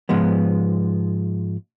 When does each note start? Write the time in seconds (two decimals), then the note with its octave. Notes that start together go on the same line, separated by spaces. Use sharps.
0.09 G#2 F3 G#3 B3